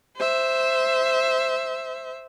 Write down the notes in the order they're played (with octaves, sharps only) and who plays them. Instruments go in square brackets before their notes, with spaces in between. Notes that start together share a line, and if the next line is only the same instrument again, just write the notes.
[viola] C5 E5